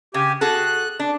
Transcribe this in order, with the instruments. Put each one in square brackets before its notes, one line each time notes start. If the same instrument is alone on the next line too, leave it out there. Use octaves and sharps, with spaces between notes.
[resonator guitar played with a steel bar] C#3 [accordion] G4 G#5
[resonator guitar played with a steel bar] F#4 G#4 A4 [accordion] F#6
[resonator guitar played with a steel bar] D4